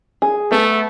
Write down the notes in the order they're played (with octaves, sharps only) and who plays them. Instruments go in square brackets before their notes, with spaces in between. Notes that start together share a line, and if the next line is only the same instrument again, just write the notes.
[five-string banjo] G#4
[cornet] A3 [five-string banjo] B3